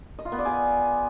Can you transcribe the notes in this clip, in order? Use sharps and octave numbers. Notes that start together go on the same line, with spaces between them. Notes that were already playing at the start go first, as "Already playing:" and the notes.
D#5
F4
B3
D5
G#4